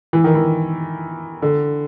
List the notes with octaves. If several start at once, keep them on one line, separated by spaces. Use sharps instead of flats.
E3
D#3
E3
D3